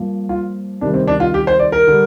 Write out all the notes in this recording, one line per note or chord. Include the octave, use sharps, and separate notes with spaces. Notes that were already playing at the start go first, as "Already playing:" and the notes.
Already playing: G2 F3 A#3
F4
C3 D#3 G3 D4
C4
D4
F4
G4
C5
D5
A#4
D3 G3